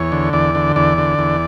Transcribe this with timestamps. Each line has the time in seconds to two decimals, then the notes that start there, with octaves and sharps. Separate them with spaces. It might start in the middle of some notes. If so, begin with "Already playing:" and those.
Already playing: E2 C#5
0.12 D3
0.33 E2 D5
0.55 D3
0.76 E2 D5
0.98 D3
1.19 E2